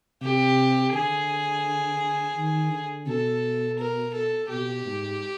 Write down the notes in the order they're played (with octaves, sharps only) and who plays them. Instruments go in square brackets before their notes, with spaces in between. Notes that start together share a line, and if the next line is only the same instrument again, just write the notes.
[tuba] C3 [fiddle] G4
[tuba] D3 [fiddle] G#4
[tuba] D#3
D3
[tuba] B2 [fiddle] A4
[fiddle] A#4
A4
[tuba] B2 [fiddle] G4
[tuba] G#2